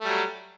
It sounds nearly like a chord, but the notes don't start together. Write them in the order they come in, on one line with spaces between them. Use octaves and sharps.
A3 G3 F#3